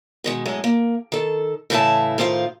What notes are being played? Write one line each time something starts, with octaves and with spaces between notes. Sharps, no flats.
B2 D#3 G#3
A2 F#3 G#3 D#5
A#3
D#3 A4
A2 C#3 E3 B4 E5 A5
A2 D#3 F4 C5 F5